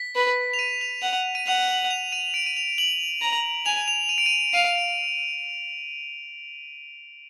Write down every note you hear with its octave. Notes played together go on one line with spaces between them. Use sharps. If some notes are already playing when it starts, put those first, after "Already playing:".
Already playing: B6
B4
F7
D#7
F7
F#5
D#7
F#5 F7
F#7
F7
D#7
D7
D#7
F7
F#7
A#5
G#5 F7
F7
D#7
D7
D#7
F5 D#7
D7